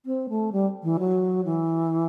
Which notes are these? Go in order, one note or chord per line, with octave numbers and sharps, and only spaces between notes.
C4
A3
G3
E3
F#3
E3